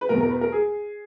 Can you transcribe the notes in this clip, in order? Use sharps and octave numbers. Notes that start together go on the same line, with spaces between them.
B4
E2 B2 A#4
A#4
B4
A#4
G#4